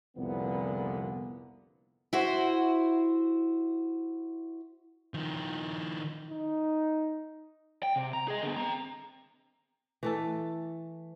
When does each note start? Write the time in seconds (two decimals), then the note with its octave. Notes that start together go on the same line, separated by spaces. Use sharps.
0.17 C2 F2 A#2 D3 B3
2.13 E4 F#4 C5
5.14 D#3 F3
6.30 D#4
7.83 G5
7.96 C3
8.13 A#5
8.28 G#4 D#5
8.43 D3 B3
8.57 C4 A#5
10.03 E3 A3 A4